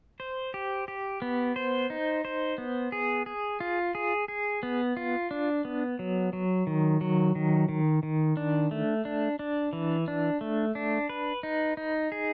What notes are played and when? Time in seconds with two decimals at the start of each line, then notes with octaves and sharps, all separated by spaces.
0.20 C5
0.54 G4
0.88 G4
1.22 B3
1.56 C5
1.90 D#4
2.25 C5
2.58 B3
2.92 G#4
3.26 G#4
3.60 F4
3.95 G#4
4.28 G#4
4.63 B3
4.97 F4
5.31 D4
5.65 B3
5.99 F#3
6.33 F#3
6.67 D#3
7.01 F#3
7.35 D#3
7.69 D#3
8.03 D#3
8.37 D4
8.71 A3
9.05 D4
9.39 D4
9.73 E3
10.08 D4
10.41 A3
10.75 D4
11.09 B4
11.43 D#4
11.77 D#4
12.12 G#4